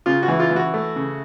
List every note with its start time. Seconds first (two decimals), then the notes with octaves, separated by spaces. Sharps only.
0.06 C#3 F4
0.23 F#4
0.28 E3
0.40 F4
0.51 E3
0.56 F#4
0.74 A3
0.96 C#3